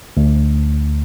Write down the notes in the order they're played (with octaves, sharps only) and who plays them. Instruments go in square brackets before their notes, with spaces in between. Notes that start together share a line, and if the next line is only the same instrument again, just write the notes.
[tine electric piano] D2